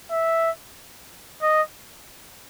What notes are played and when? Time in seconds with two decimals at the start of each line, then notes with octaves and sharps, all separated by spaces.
0.11 E5
1.42 D#5